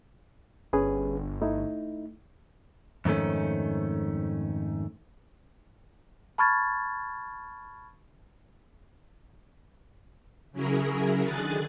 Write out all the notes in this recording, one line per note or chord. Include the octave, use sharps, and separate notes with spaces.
G1 C#4 G#4 B4
A3 D#4 E4
F2 G#2 D#3 A3 C#4
A5 B5 C#6 F6 G#6 A6
C#3 F#3 C#4 E4 G#4 A#4
D3 D#3 G#4 G#5 F#6 A6